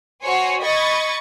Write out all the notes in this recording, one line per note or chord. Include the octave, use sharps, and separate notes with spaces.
F#4 C5 C#5 G#5
D#5 B5 C#6 G#6 A6